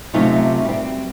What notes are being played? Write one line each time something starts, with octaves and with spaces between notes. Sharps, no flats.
C3 F#3 A3 C#4 D#4 F4
G3 C4